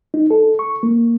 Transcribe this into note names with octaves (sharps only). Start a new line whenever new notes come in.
D#4
A4
C#6
A#3